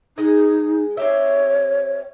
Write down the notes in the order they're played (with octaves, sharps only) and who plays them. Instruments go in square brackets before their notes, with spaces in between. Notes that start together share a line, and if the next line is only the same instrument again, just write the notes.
[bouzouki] G#3 G#4 [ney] D#4
[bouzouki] C4 G4 E5 [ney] C#5